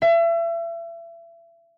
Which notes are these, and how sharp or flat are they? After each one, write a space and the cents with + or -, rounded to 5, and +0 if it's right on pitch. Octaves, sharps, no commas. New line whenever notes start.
E5 +35